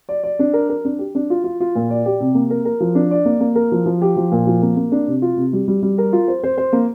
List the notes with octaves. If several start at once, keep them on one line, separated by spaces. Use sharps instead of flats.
D5
D5
D4
A#4
A#4
D4
G4
D4
F4
F4
F4
A#2
D5
G4
C3
A#3
A#4
A#4
F3
D4
D5
A#3
A#3
A#4
F3
F3
G4
F3
A#2
F3
A#3
A#3
D4
C3
F4
C3
G3
G3
G3
A#4
F4
C5
C5
C5
A#3